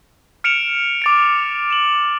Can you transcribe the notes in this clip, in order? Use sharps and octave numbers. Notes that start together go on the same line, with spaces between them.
F6 C#7 D7 E7 F7
D6 A6 D7
E7 F#7